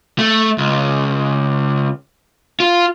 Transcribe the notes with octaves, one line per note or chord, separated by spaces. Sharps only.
A3
C#2
F4